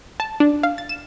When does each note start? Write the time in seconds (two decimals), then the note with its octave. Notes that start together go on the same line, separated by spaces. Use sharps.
0.20 A5
0.40 D4
0.63 F5
0.78 A6
0.89 E7